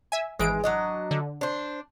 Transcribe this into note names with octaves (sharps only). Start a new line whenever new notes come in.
E5 G#5
G#1 E3 G#3 D7
F#3 D4 D#5
D3
D4 C5